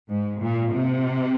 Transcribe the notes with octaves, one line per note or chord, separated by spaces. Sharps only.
G#2
A#2
C3